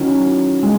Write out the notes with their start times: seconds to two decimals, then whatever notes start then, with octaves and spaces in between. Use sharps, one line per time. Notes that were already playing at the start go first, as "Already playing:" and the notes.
Already playing: D#3 F#3 C#4 E4
0.62 A2 G#3